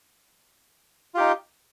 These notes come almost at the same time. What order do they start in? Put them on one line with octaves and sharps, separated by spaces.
F4 G4 D#4